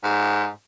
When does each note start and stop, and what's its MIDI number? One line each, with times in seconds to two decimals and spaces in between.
0.03 0.48 44